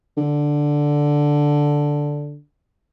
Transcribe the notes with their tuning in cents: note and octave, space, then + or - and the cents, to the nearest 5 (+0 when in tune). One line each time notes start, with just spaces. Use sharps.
D3 +0